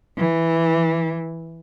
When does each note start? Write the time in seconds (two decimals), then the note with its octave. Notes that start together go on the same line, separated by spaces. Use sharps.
0.18 E3